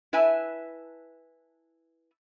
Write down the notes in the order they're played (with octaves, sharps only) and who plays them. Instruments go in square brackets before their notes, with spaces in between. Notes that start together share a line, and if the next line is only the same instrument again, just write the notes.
[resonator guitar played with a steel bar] E4 B4 E5 G#5 A5